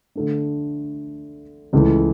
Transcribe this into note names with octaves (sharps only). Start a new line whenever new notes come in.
D3 A3 D4
C#2 C#3 E3 A3